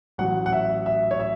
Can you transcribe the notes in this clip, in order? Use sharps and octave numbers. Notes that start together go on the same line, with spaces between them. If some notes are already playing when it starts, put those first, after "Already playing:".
A1 A2 F#3 F#5
F#5
E5
E5
C#5
E5